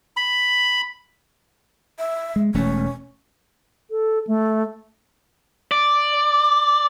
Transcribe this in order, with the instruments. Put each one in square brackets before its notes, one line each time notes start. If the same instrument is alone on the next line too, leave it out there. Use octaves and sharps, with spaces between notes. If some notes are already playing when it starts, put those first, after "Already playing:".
[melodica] B5
[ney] E5
[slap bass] G#3
[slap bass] E1 E2 A3 [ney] C#4
[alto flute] A4
A3
[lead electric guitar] D5